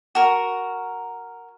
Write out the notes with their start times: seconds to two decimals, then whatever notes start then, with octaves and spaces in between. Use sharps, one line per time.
0.15 F#4 A#4